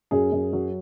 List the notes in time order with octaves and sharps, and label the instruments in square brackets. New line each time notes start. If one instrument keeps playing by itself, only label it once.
[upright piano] F#2 G#4
F#2
F#3